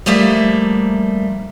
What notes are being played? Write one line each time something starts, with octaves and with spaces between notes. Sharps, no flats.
F3 G3 A3 A#3 E5